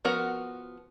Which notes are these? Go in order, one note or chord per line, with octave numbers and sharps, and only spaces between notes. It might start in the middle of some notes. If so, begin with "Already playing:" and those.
F3 B3 F#4 A#4 F#5